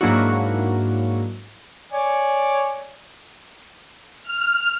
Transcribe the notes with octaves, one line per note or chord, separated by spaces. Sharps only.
G#2 F#3 A#3 D4 E4 F#4
C#5 D5 G#5
F6